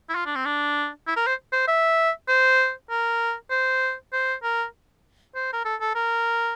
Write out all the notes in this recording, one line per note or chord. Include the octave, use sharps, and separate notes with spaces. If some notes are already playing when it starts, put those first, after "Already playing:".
E4
F4
D4
C4
D4
E4
A#4
C5
C5
E5
C5
A#4
C5
C5
A#4
C5
A#4
A4
A4
A#4